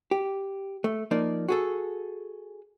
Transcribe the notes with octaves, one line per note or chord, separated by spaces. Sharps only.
G4
A3
F3 A#3 D#4 D5
F#4 G#4 A4